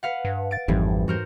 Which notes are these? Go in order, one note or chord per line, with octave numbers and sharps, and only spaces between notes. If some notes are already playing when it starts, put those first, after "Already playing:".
B4 F5 F#5
G2
A6 D7
G#1 F2 G#2 E3 G3
F#4 A#4 C5